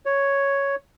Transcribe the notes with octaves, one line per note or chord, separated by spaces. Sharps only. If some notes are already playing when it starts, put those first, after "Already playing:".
C#5